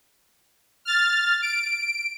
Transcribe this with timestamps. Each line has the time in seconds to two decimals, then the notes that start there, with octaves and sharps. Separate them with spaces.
0.85 F6 A6
1.42 D7